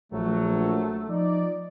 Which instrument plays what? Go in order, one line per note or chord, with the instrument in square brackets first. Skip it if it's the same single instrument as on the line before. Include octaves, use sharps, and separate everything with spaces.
[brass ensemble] A#1 F#3 [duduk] A3
[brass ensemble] F3 D#4 D5